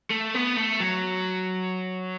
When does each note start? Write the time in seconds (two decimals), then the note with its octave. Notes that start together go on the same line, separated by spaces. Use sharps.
0.10 A3
0.34 B3
0.57 A3
0.80 F#3